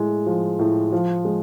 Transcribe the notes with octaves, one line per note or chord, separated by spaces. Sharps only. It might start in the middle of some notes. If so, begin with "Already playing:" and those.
Already playing: A2 G#3
F3
A2
F3
G#3